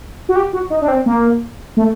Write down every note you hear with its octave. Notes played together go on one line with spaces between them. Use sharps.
F#4
G4
F#4
D#4
D4
C4
A#3
A3